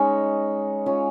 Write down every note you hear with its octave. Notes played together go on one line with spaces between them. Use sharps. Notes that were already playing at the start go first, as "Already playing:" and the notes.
Already playing: G#3 C#4 D#4
C#4 F4